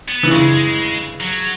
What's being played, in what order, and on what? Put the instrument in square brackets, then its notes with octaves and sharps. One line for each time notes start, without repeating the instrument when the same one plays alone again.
[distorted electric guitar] B3
[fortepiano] E3
[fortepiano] C#3 [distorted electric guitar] G#3
[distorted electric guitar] F#3